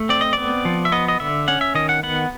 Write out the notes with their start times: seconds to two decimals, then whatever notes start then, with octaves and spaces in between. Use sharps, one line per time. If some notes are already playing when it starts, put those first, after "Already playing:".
Already playing: A3
0.09 C4 D5
0.21 D#5
0.33 B3 D5
0.65 F3
0.85 E5
0.92 B3 D#5
1.08 D#5
1.20 D3 E5
1.48 C#4 F#5
1.61 E5
1.75 D#3 D#5
1.89 F#5
2.03 B3 F#5